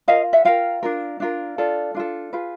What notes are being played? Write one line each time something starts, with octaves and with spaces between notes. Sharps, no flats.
F4 A#4 D#5 F5
E5 F#5
F4 A#4 F5 G5
D4 F4 A#4
D4 F4 A#4
D4 F4 A4
D4 F4 A4
F4 G#4 B4